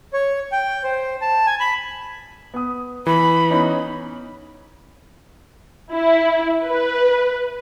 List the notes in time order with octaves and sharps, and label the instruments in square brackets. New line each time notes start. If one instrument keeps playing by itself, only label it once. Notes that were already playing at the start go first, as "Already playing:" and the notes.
[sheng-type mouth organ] C#5
G5
C5
A5
G#5
B5
[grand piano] B3 D#6
[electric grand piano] E3 [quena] B5
[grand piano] B3 C#4 D#4
[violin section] E4
B4